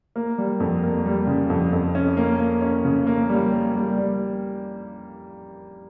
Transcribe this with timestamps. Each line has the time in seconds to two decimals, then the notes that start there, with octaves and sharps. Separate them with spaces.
0.16 A#3
0.38 G3
0.60 F2
0.83 A#3
1.06 G3
1.27 C#3
1.50 F2
1.73 F2
1.95 C#4
2.17 A#3
2.40 A#3
2.62 C#4
2.85 C#3
3.07 A#3
3.30 G3
3.52 A#3
3.75 G3
3.98 G3